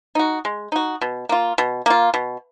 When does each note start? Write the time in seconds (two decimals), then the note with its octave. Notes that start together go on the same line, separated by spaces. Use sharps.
0.15 D#4 F#4
0.45 G#3
0.72 D#4 F#4
1.01 B2
1.29 A#3 F4
1.58 B2
1.86 A#3 F4
2.14 B2